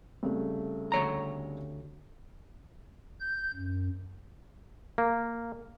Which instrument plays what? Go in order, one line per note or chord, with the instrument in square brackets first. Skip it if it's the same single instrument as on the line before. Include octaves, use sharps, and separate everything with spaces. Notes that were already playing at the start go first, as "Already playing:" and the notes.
[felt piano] C2 C#3 A3
[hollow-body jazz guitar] D2 C#5 A#5
[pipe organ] G6
F#2
[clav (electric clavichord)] A#3